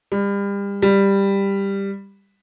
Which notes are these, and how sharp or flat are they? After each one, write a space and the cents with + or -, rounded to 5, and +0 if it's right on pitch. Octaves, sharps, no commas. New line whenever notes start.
G3 +35
G3 +10